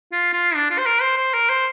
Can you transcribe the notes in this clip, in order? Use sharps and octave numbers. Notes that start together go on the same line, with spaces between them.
F4
F4
D4
F4
C5
A#4
C5
C5
A#4
C5